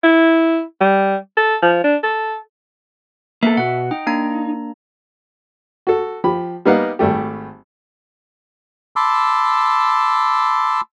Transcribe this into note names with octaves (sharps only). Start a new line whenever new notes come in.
E4
G3
A4
F3
D4
A4
A#3 B3 A4 E5
B2 F#4 F#5
D#4 G5
A#3 D4 A#5
F#4 A4
F3 G4 B5
G3 A#3 B3 D#4 F5 F#5
G#1 G3 A3 G4
A5 B5 C6 D6 E6